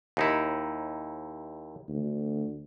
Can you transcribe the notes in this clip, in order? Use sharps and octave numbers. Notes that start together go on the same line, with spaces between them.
D#2 D#4 E4
D2